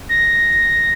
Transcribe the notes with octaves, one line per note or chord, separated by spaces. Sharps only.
A#6